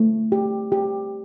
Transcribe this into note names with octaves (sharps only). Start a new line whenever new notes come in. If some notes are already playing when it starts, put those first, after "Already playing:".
Already playing: A3
G4
G4